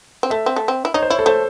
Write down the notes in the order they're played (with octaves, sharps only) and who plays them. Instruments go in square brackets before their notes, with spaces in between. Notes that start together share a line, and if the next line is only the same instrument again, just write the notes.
[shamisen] C4
[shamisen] A3 [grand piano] E5
[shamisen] C4
A3
C4
E4
[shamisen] D#4 [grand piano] C#5
[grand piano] C5
[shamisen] E4 [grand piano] C#5
[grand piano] A4
[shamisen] A3 [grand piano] C5